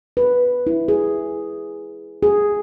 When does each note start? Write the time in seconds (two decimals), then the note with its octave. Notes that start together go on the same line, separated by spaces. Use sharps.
0.17 B4
0.67 E4
0.88 G#4
2.23 G#4